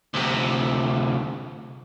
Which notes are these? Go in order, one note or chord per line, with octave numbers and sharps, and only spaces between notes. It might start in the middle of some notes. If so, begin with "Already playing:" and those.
D2 C3